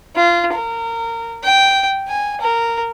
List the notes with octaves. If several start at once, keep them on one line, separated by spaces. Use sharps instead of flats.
F4
A#4
G5
G#5
A#4